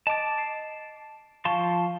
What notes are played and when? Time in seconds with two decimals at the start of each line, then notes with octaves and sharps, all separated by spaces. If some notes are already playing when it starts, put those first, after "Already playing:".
0.07 D#5 A5 D6 A6
0.38 C7
1.45 F3 F5 A5 C6 C#6